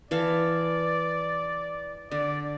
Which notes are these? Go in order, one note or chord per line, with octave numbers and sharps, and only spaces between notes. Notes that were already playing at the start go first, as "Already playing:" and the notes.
E3 A4 D5 F5
D3 D5